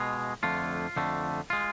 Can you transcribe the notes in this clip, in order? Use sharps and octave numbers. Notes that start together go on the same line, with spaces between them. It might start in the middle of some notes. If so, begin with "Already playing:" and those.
Already playing: B2 G#3 F4
F2 D3 A3 F4
F2 D3 A3
G#3 F4